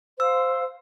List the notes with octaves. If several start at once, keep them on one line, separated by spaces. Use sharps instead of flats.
C5 F5 E6